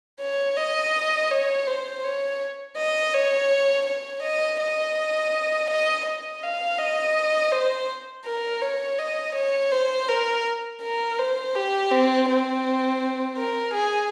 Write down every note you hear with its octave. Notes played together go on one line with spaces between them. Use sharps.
C#5
D#5
C#5
C5
C#5
D#5
C#5
C#5
D#5
D#5
D#5
D#5
F5
D#5
C5
A#4
C#5
D#5
C#5
C5
A#4
A#4
C5
G4
C4
C4
A#4
G#4